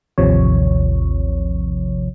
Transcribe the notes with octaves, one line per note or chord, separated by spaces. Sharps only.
A1 D#2 C3 F3 C#5